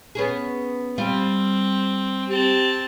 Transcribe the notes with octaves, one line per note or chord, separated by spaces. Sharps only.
B3 C#4 G#4
G3 C4 F4
C4 G4 A5